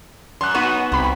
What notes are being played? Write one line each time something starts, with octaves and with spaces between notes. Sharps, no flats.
F#2 C6 F#6
B3 D#4 F#4 C#6 D#7 E7
C2 C3 B5 B6